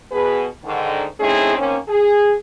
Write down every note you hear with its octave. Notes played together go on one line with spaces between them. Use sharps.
B2 G#4 B4
G#2 D3 D#3
A3 C4 C#4 D#4 E4 G#4
D#3 A#3 C4 C#4
G#4